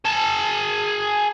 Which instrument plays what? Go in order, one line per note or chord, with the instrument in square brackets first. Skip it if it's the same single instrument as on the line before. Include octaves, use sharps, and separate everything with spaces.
[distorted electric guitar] G#4 A5